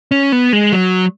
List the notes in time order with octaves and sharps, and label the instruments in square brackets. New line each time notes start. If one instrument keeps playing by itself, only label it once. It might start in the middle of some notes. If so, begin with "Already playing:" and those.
[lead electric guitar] C#4
B3
G#3
F#3